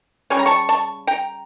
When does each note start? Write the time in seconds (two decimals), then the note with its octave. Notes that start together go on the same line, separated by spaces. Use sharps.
0.30 C#3 G3 C#4 C#6
0.39 A#5
0.46 A5 C#6
0.69 A5 C#6
1.07 G5 A#5